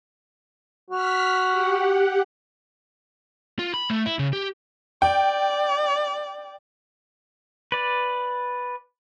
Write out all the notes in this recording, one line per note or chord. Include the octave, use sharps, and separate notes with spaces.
F#4 F6 B6
G4 F#5
F4
B5
A3
E4
C#3
G4
D5 G5
B4 D5